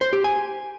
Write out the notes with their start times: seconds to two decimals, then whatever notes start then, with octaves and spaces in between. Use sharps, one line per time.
0.01 C5
0.13 G4
0.24 G#5